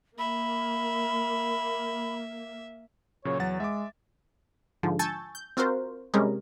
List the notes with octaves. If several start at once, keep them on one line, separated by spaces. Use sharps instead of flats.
A#3 E5 B5
A#2 C#3 F#3 C#5
E2 F#3 F#5 A6
G#3 E5 D6
G#2 D3 F3
G#5 A5 C#6 E6 G6 A6
G6
C4 F4 F#4 A#4 C5
C3 G3 G#3 C#4 G#4 A#4